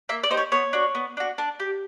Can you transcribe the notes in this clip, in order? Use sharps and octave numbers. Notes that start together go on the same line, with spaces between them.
A#3 E5
D5
D#4 G4 C5
C#5
B3 C#5
D4 F#4
B3
D4 F#4
D4
G4